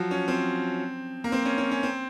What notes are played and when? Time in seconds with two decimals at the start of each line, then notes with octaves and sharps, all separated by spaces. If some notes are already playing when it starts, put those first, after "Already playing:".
Already playing: F3 F#3
0.11 C#4
0.28 C4
1.24 A#3
1.32 C4
1.45 C#4
1.58 C#4
1.71 C#4
1.83 C4